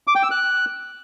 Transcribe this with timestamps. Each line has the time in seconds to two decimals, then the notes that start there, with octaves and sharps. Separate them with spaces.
0.07 D6
0.15 G5
0.23 E6
0.31 F#6